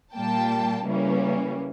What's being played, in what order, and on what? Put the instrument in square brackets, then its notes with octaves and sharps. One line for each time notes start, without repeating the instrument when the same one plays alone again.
[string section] A#2 G3 A#3 G5 A5
C#3 E3 G3 A#3 C#4